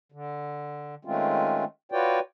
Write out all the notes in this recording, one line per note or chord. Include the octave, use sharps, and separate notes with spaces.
D3
D#3 G#3 A3 C4 C#4 F4
F4 F#4 B4 C#5 D5 G5